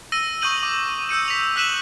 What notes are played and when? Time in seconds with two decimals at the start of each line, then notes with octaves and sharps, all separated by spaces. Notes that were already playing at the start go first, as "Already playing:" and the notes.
0.12 E6 A#6 D#7 G7
0.42 C#6 D#6 E6 G6 D#7 F#7
0.63 D6
1.09 E6 G6 C#7 D#7
1.28 B6 F7
1.56 E6 F#6 B6 D#7 E7 F#7